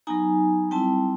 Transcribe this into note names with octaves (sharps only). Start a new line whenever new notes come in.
F#3 B3 D#4 G#5 A#5
G3 C4 E4 G5 A5